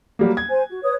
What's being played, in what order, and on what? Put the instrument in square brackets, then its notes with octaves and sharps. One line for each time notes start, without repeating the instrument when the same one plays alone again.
[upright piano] F#3 G3 A#3
G#6
[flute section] C5 G#5
F#4
B4 C#5 D#6